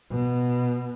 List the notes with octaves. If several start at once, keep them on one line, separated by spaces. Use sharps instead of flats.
B2